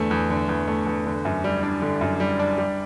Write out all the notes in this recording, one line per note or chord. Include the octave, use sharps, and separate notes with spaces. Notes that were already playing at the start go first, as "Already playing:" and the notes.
Already playing: E2 D3 A3
E2
D3
E2
A3
E2
D3
F#2
G3
D4
D3
F#2
G3
D4
G3